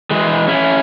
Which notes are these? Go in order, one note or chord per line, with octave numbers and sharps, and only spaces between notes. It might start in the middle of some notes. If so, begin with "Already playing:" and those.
E3 G#3
C#4 E4